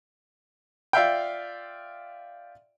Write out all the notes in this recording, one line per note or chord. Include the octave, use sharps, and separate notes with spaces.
F4 D5 E5 F5 G5